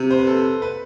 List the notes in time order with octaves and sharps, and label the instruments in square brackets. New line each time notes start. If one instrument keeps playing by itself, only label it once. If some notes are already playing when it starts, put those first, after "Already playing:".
Already playing: [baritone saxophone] C3
[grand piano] C5
B4
A4
B4